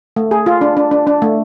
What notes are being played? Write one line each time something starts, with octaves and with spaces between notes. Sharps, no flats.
A3
G#4
F4
D4
D4
D4
D4
A3